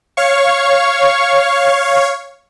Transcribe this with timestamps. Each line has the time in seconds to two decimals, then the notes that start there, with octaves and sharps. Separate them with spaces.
0.17 C#5 F5 C#6